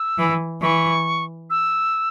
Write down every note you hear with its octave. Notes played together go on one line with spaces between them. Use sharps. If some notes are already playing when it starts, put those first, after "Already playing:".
Already playing: E6
E3
E3 C#6
E6